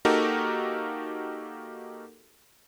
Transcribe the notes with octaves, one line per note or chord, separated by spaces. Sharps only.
A#3 D#4 F#4 G4 A4 A#4